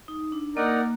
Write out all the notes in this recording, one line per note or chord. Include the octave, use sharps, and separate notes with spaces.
D#4
D4
A#3 D#4 A#4 D5 F#5